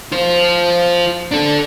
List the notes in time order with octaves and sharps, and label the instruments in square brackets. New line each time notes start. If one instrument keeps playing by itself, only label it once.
[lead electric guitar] F4 C5
D4 A4